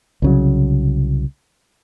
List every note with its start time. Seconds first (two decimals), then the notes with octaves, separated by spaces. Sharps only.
0.22 C2 C#3 F#3